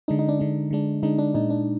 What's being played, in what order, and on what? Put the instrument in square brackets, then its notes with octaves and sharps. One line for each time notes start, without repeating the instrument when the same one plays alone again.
[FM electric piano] D3 G#3 D4 D#4
D#4
D4
D3 G#3 D4
D3 G#3 D4
D3 G#3 D4 D#4
D4
A#2 G#3 D4 D#4
D4